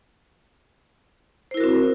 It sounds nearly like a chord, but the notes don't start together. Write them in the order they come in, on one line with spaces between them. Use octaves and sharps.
C5 E4 A#4 F#4 C4